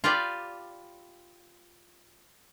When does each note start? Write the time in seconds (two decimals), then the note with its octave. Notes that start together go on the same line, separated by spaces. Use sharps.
0.04 F4 G4 B4 D5